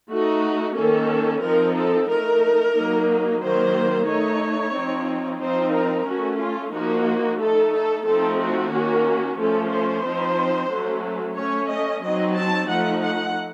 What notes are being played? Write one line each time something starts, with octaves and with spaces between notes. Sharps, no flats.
A3 D#4 F#4
D#3 A#3 C#4 A4
F3 C4 D#4 A#4
A4
A3 D#4 A#4
F#3 A#3 D#4
D#3 F#3 A#3 C5
A3 D#4 C#5
F3 C4 D#4
F3 C4 D#4 C5
A#4
A3 C#4 F#4
F4
F3 A#3 D#4 F#4
A3 D#4 A4
A4
F3 A3 C4 D#4 A4
F#4
D#3 A#3 C#4
F3 A3 C#4 A4
C5
F3 C4 D#4
F#3 A3 C#4
A3 C#4 C#5
D#5
F#3 C4 D#4 D#5
A5
F3 A3 D#4 F#5
F#5